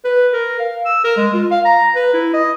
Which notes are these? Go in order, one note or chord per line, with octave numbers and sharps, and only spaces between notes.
B4
A#4
F5
E6
A#4
G#3
F4
F5
A#5
B4
E4
D#5